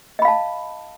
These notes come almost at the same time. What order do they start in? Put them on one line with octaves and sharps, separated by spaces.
D#5 B5 F5 A5